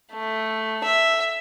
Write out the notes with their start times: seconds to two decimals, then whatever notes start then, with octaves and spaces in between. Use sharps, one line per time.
0.13 A3
0.85 E5